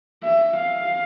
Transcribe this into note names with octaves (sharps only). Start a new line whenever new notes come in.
E5
F5